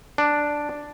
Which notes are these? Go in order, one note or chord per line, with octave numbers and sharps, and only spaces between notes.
D4